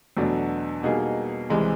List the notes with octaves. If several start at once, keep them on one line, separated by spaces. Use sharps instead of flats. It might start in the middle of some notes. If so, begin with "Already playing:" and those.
E2 B2 F#3 A3 D4
B2 G3 A#3 D#4 G#4
C2 C3 E3 G#3